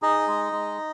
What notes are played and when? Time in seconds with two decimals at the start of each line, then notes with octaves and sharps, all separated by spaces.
0.02 D#4 G#4 D#5
0.28 G#3
0.52 G#3